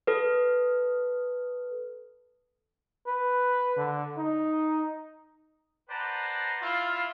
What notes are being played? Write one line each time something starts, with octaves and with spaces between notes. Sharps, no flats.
A4 B4
B4
D3
D#4
B4 C5 D5 F#5 A5 A#5
E4 F4 D5 F5